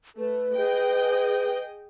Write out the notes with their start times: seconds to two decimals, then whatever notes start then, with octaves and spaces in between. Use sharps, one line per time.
0.19 A3 B4
0.56 G#4 D#5 G5